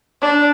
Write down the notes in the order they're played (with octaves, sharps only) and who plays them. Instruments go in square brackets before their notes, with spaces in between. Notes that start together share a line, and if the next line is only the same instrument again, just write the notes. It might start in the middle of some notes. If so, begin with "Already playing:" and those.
[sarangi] D4